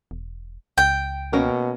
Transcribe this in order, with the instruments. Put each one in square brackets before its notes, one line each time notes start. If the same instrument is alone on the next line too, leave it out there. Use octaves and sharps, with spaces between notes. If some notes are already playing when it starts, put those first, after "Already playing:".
[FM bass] E1
[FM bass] C#2 [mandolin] G5
[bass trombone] B2 [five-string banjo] A#3 C#4 A#4